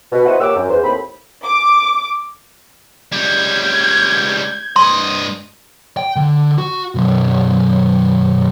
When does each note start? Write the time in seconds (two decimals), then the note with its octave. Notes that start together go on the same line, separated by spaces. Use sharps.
0.13 B2
0.26 E4 F#4 B4 C5 D#5 F#5
0.40 A#2 G4 C#5 F#5 D6 E6
0.56 F#2
0.70 E2 C5
0.83 D#2 A2 C4 B5
1.43 D6
3.12 C#2 G3 G6 G#6
4.76 G2 D#5 C6
5.97 G5
6.16 D3
6.58 F#4
6.95 B1 F#2